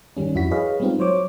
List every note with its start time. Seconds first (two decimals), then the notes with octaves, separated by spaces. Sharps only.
0.17 G2 D#3 G3 C#4
0.35 F2 E4 F#4 B6
0.51 G#4 B4 C#5 D#5 F5
0.80 G3 G#3 B3 C4 D#4 F4
0.99 F#3 C5 C#5 D6